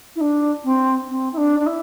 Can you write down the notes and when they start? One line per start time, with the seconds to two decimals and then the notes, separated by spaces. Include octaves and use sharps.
0.16 E4
0.21 D4
0.64 C4
1.08 C4
1.33 E4
1.37 D4
1.60 D4
1.66 E4